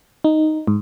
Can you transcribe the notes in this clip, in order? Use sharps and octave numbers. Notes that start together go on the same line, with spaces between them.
D#4
G#2